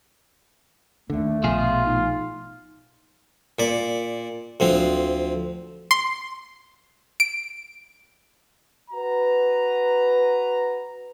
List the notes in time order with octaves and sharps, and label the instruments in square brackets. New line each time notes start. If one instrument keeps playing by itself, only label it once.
[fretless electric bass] D#2 D3 [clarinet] A3
[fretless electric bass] A#1 [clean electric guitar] B2 F3 G#4 [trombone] F4
[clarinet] D#4
[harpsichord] A#2 D5
D2 F3 C4
[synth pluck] C6
D7
[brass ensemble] F#4 B4 A#5